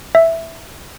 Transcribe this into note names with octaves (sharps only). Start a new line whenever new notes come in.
E5